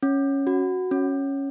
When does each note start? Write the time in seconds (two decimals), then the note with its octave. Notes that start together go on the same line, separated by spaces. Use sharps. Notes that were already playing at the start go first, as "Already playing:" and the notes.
0.03 C#4
0.47 F#4
0.91 C#4